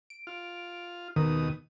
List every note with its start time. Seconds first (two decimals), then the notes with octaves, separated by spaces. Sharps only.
0.10 D7
0.27 F4
1.16 D#2 B2 D#3 D#6